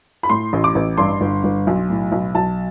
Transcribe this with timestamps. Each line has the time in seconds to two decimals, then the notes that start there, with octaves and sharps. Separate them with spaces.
0.23 B5
0.29 A2 C6
0.53 A1
0.64 D6
0.75 A1
0.98 G2 C6
1.21 G1
1.44 G1
1.67 B1
1.90 A2
2.12 B1
2.35 B1 A5